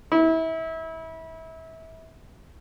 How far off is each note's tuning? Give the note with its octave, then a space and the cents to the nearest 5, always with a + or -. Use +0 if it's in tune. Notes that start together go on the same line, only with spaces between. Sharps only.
E4 -30